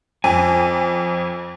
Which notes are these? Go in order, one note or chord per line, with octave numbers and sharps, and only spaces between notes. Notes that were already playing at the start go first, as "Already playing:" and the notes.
F2 G#5